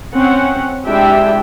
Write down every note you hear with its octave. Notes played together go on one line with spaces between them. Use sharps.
C4 C#4 F#5
G#3 D4 E4 G4 E5 G5